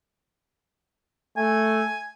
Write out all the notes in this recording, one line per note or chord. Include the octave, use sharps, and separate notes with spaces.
A3 G#5